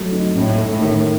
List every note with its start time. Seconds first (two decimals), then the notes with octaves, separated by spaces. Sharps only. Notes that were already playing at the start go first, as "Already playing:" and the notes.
Already playing: F#3 A3
0.12 D#4
0.35 A2 C#4
0.58 A3
0.70 A2
0.82 D#3